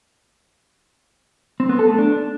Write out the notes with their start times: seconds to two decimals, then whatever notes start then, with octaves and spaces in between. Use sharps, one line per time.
1.60 C4
1.69 B3
1.79 A4
1.89 A3
1.98 D4